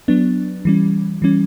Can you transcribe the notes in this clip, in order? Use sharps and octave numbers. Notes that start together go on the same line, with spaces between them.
F#3 B3 D4
E3 G3 C#4
E3 G3 C#4